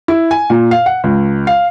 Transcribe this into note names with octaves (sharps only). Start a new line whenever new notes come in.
E4
G#5
A#2
F5
F#5
C#2
F5